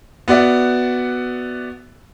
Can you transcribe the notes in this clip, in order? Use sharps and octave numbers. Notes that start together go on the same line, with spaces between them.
B3 F#4 D5 E5